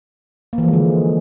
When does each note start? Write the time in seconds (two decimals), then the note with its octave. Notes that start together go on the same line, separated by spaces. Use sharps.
0.53 A#3
0.58 E3
0.63 F3
0.68 G#3
0.73 D3